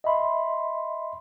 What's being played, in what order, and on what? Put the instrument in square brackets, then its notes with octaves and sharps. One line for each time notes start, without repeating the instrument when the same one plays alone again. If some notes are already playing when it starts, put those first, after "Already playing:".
[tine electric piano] D#5 E5 B5 C6